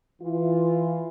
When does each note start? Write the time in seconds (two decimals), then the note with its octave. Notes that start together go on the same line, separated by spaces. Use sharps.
0.22 E3 F4